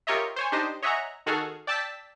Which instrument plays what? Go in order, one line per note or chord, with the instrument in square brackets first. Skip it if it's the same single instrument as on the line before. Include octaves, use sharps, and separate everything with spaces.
[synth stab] F4 G4 A#4 C#5 D#5 E5
C5 C#5 G#5
D4 D#4 G4 C5 D#5
C#5 D#5 E5 F#5 G#5 A#5
D#3 F#4 G#4 A4 F6
D5 G5 A5 E6 A6 B6